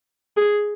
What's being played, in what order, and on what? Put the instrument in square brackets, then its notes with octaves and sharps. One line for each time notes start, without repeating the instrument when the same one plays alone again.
[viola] G#4